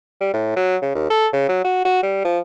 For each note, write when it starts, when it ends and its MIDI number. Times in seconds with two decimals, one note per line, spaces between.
0.21 0.31 55
0.34 0.53 45
0.56 0.77 54
0.82 0.91 49
0.95 1.09 39
1.10 1.27 69
1.33 1.48 49
1.49 1.64 54
1.64 1.82 66
1.85 1.98 66
2.03 2.23 55
2.25 2.39 53